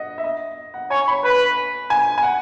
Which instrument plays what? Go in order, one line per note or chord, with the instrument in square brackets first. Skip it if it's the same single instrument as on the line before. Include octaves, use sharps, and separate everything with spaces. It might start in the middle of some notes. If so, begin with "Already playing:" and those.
Already playing: [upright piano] D#5 F#5
E5
D#5
F#5
[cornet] C#5 [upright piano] G#5
[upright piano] B5
[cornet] B4 [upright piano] B5
[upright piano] G#5
G#5
F#5